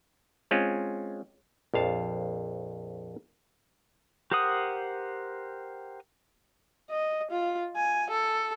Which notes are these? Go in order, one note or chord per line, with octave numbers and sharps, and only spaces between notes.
G#3 C4 C#4 F4
A#1 F2 F5 A5
G4 A#4 C5 F#5 D#6
D#5
F4
G#5
A4